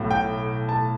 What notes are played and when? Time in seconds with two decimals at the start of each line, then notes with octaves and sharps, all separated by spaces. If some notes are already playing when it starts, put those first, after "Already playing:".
Already playing: B1 A2 F#3
0.11 G5
0.69 A5